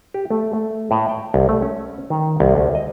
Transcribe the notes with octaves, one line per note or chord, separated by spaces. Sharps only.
G4
A3
A3
A2
G5
C2
A3
C#4
D#3
C2
D2
D#5